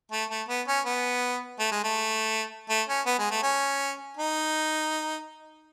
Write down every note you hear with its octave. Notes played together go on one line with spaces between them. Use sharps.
A3
A3
B3
C#4
B3
A3
G#3
A3
A3
C#4
B3
G#3
A3
C#4
D#4